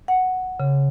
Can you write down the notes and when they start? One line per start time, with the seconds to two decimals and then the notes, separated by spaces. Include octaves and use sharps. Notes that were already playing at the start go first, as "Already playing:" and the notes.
0.08 F#5
0.60 C#3